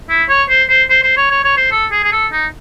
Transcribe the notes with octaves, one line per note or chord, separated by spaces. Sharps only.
E4
C#5
C5
C5
C5
C5
C#5
C#5
C#5
C5
A4
G#4
G#4
A4
D#4